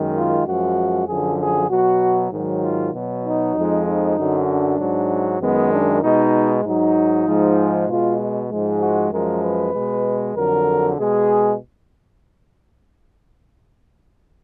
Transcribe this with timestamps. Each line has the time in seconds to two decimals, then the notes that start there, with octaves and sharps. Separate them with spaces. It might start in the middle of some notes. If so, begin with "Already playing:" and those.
Already playing: F#2 D#3 G#3
0.15 F4
0.47 F#2 F3 G#3 F#4
1.08 F#2 D3 F3 G#4
1.39 G#4
1.70 B2 F#3 F#4
2.32 G#2 D#3 F#3
2.62 F4
2.94 B2 F#3
3.24 D#4
3.56 F2 F3 G#3
3.86 D#4
4.17 F#2 D3 F#3
4.48 D4
4.79 G#2 F#3
5.41 F#2 D#3 G#3 B3
5.72 D4
6.03 B2 G#3 D#4
6.64 G#2 F#3 D#4
7.26 G#2 F3 G#3
7.88 B2 G#3 F4
8.50 G#2 F3 G#3
8.81 F#4
9.12 F#2 F3 G#3 A#4
9.43 B4
9.73 B2 G#3
10.35 F2 D3 F#3 A#4
10.97 B2 G#3 G#4